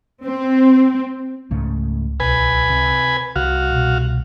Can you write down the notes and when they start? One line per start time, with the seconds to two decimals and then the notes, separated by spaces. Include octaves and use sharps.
0.25 C4
1.51 C#2 G#2 C#3 A3
2.20 B1 B4 G#5
2.69 C3
3.36 C2 F#4 F5
3.71 B2